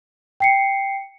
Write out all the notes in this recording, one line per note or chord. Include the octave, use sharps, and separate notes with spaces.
G5 C7 C#7